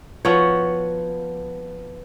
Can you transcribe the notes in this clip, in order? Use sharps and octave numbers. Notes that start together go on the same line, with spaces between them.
F3 B3 F#4 C#5